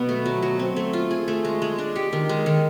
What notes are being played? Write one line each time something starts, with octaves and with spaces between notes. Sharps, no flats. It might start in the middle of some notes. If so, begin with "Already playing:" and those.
Already playing: B2 F#3 B3
A3
F#3
F#3
C4
A3
F4
G#4
A3
G#3
G#3
D4
G4
D#3
G#3
D#3